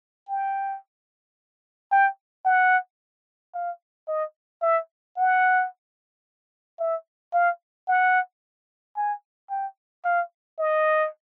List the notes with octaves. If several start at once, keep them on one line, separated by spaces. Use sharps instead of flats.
G5
G5
F#5
F5
D#5
E5
F#5
E5
F5
F#5
G#5
G5
F5
D#5